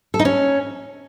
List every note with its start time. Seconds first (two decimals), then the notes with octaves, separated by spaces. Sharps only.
0.14 A4
0.19 D#4
0.25 C#4